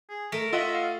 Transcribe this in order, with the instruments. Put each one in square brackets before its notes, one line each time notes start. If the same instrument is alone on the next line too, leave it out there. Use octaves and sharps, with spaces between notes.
[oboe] G#4
[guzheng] A3 [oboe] A#4
[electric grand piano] F4 D#5 F#5 [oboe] E5
[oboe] F5